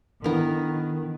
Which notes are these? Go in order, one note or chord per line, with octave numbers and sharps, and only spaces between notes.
D#3 B3 D4 E4 A4 A#4